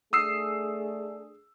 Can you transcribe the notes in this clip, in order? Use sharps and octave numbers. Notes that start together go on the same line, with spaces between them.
A3 D4 G#4 D#6 E6 C7